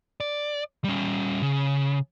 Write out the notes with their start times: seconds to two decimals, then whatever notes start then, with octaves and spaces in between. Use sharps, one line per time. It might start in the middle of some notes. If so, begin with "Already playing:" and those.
0.20 D5
0.84 G3 C#4
1.42 C#3